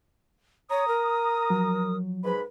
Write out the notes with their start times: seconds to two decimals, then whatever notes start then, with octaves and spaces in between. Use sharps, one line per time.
0.70 C#5 A#5 D#6
0.88 A#4
1.50 F3 F#3
2.24 G#2 B4 B5